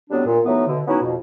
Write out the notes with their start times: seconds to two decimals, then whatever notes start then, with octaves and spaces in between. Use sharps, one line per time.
0.10 A2 F#3 G3 B3 C4 D4
0.26 A#2
0.45 E3 F#3 A3 B3 D#4
0.67 B2 D3
0.87 F#3 B3 C#4 D#4 E4 F#4
1.02 F2 B2